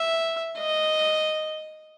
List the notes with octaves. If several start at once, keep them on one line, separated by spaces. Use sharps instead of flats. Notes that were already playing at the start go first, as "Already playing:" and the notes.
Already playing: E5
D#5